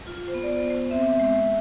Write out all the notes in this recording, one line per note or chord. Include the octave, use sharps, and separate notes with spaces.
F4
C5
B3
D5
C5
B3
C5
C4 E5
G#3